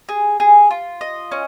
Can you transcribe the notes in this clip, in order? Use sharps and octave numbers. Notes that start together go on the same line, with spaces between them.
G#4
G#4
F4
D#5
C#4